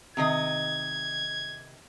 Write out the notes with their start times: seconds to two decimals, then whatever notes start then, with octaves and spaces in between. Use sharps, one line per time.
0.17 C3 D#3 D#5 G#6